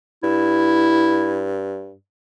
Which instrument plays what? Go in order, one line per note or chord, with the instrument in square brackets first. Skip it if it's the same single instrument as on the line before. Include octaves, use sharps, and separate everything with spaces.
[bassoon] G2 [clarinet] E4